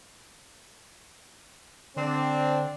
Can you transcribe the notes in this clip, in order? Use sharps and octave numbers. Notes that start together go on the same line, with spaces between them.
D3 C4 D4